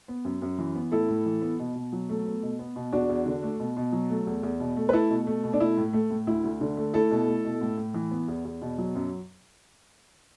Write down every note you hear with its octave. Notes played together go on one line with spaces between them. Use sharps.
B3
F#2
F#2
E3
B3
A2 E4 A4
A2
E3
B3
B2
B2
F#3
A3
B3
B2
B3
B2
E2 D4 F#4
E2
D3
A3
B2
B2
F#3
A3
E2
E2
B2
A3
B4
A3 E4 A4
B2
A3
B2
D4
A3 E4
A2
A3
A2
D2 E4
D2
D3
A3
A3 E4 A4
B2
A3
B2
A2
A2
E3
B3
E2
E2
B2
F#3
F#2